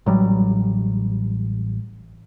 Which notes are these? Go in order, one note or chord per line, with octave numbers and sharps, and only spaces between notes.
A1 F#3 G3